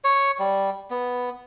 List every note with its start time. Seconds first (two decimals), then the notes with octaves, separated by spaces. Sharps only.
0.04 C#5
0.39 G3
0.90 B3